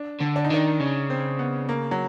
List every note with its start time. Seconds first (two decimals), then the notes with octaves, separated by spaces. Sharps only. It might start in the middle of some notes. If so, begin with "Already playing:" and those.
Already playing: D4
0.21 D3
0.36 D4
0.45 D#4
0.50 D#3 D4
0.80 C#3 C#4
1.10 C4
1.39 B3
1.69 A#3
1.91 F#3